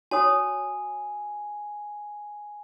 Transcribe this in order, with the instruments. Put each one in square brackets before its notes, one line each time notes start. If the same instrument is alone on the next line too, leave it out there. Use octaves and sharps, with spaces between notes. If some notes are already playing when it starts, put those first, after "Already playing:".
[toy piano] F#4 C#5 D#6 [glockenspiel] G#5